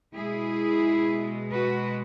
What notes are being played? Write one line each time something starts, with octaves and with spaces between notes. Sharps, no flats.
B2 G#3 E4 G#4
F#4 B4